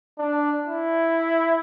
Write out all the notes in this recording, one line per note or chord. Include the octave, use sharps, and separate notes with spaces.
D4
E4